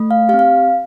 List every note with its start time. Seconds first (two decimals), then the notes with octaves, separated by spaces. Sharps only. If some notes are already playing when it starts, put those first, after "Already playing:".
Already playing: A3
0.11 F5
0.29 G4 F5
0.34 C4
0.39 F5